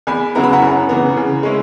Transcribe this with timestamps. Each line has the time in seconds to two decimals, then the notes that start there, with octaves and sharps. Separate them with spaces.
0.07 E2 G#5 B5
0.35 C#3 F#3 B3 E4 A#5
0.44 B5
0.53 F#5 A#5
0.62 F#2
0.89 C#3 E3 B3
1.17 C#3
1.43 G#3 C#4 E4